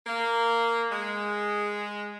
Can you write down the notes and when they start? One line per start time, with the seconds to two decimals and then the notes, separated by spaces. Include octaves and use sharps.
0.07 A#3
0.91 G#3